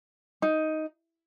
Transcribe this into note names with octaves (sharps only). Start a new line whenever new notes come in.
D#4